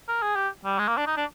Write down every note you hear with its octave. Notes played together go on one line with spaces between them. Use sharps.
A#4
G#4
G4
G3
G#3
A#3
D4
D#4
D4